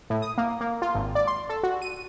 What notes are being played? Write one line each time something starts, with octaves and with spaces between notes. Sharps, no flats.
A2
D#6
A#3
A#3
F4
G#1
D5
C6
A4
F#4
D#7